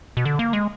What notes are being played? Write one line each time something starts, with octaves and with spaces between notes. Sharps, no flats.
B2
D3
A#3
G#3